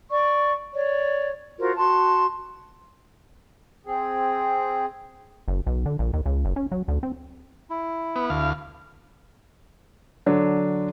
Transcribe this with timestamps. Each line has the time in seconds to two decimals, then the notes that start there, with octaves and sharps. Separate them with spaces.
0.10 D5 C#6
0.75 C#5 D5
1.58 F4 F#4 A#4 C5
1.76 F#4 A5 C6
3.86 C4 G#4
5.48 F#1
5.67 B1
5.86 D3
5.99 A#1
6.13 D#2
6.26 C#2
6.45 F#1
6.56 C#4
6.72 F#3
6.88 D2
7.03 C4
7.70 E4
8.16 B3
8.30 D2 F5
10.26 D3 F#3 D4